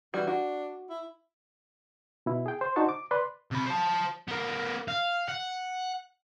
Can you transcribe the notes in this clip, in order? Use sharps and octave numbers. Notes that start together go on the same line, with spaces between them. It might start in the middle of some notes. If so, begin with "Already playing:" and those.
E3 G3 F#4
D4 F#4
E4
B2 E4
G#4 G5
C5
D4 D#4 F#4 C5 A5 C#6
D6
B4 D5 C6
C3 B5
C5 A5
B3 A#4
F5
F#5